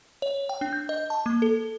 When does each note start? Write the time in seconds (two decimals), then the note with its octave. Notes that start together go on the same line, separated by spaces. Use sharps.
0.22 C#5
0.49 G5
0.61 D4
0.73 G6
0.89 D#5
1.10 A5
1.26 A#3
1.42 A4